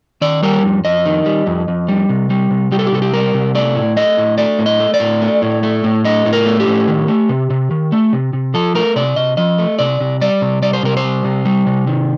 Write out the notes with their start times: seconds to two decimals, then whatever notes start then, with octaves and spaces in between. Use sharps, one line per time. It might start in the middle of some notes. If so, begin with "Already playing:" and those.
0.21 D#3 D5
0.43 G3 A#4
0.64 F2
0.85 F2 D#5
1.06 D#3
1.26 G3
1.47 F2
1.68 F2
1.89 G3
2.09 C3
2.30 G3
2.51 C3
2.72 G3 G4
2.79 A4
2.86 G4
2.92 C3 A4
3.02 G4
3.13 G3 A#4
3.34 C3
3.55 A3 D5
3.75 A2
3.96 A3 D#5
4.18 A2
4.38 A3 D5
4.59 A2
4.66 D#5
4.80 A3
4.94 D5
5.00 A2
5.21 A3
5.42 A2
5.63 A3
5.84 A2
6.05 A3 D#5
6.26 A2
6.33 A#4
6.46 A3
6.60 G4
6.67 A2
6.88 D#3
7.08 A3
7.29 C3
7.50 C3
7.71 D#3
7.92 A3
8.13 C3
8.33 C3
8.54 F3 A4
8.75 A3 A#4
8.96 C3 D5
9.16 C3 D#5
9.37 F3 D#5
9.58 A3
9.79 C3 D5
10.00 C3
10.21 G3 D5
10.42 C3
10.62 G3 D5
10.73 C5
10.83 C3 A#4
10.97 C5
11.04 G3
11.25 C3
11.45 G3
11.66 C3
11.87 D#3